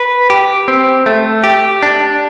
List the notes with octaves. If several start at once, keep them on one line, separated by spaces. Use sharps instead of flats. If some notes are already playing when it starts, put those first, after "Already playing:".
Already playing: B4
G4
C4
A3
G4
D4